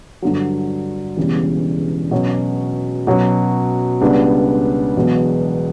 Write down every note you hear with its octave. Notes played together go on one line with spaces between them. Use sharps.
G2 D3 F#3
E1 E2 C#3 E3 G3
B2 F#3 C#4
B2 F#3 C#4
C#2 C#3 G3 B3 D4
E1 E2 B2 F#3 B3